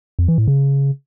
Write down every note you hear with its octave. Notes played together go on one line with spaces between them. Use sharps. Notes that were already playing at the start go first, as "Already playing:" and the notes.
F2
E3
A2
C#3